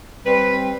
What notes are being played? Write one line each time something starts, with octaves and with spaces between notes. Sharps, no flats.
G3 C4 B4